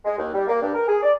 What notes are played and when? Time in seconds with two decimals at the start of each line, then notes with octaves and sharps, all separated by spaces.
0.05 G#3
0.18 D#2
0.34 G3
0.47 A#3
0.62 G2
0.74 A#4
0.88 G#4
1.03 D5